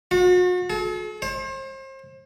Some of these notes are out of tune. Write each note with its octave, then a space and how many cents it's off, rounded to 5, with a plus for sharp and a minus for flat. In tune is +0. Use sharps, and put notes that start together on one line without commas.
F#4 -40
A4 -45
C5 +35